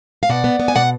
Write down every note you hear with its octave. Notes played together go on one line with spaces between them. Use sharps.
F5
B2 D5 F#5
B3
B3
G#5
B2 D5 F#5